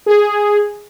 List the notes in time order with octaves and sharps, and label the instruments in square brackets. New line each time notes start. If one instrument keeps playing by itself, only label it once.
[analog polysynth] G#4